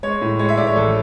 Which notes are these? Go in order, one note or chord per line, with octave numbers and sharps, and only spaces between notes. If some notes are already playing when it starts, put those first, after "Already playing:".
G#3 C#5
A2
G#3 C#5
E5
A2 D5
C#5
A1 A4